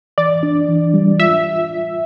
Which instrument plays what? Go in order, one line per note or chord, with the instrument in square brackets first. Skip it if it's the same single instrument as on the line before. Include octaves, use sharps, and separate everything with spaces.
[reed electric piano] E3 [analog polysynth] D5
[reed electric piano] D4
E3
G3
[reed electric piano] F4 [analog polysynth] E5